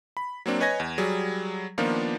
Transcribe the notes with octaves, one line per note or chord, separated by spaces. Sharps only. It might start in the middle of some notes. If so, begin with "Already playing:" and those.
B5
F#3 A#3 C4 D4
B4 C#5 D#5 G#5 G#6 A#6
E2
F#3 G3 G#4
D#3 F3 A#3 B3 D4 F4